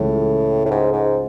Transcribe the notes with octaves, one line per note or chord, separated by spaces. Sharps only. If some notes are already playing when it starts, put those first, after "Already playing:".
Already playing: C#2 A2 C#3 E3 A3
A2
G#2
G#2